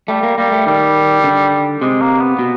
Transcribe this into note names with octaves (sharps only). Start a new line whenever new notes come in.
G3 A3
A#3
G3 A#3
A3
D#3 G3
D3
C3 G#3
A#3
B3
B2